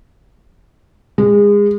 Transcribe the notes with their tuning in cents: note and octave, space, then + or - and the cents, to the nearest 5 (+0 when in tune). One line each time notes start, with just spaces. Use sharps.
G#3 -25